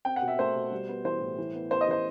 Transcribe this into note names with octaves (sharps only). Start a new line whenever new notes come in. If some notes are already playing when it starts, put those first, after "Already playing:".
C4 G5
F#5
B2
E5
A3 C5
B2
G3
B3
E3 C5
A2
E3
B3
B3 C5
D#5
E3 C5